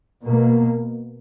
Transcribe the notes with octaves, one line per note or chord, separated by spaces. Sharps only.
B2
A#3